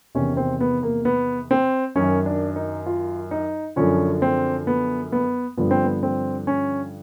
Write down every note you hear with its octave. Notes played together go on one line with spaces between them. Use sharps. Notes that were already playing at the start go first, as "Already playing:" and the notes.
E2 C3 D#3 C#4
C4
B3
A#3
B3
C4
F#2 D#3 C#4
D4
D#4
F4
D#4
F#2 D3 F3 C#4
C4
B3
B3
G2 D3 F3 B3
C4
B3
C4
C#4